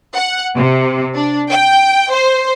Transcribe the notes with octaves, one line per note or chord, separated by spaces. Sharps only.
F#5
C3
D4
G5
C5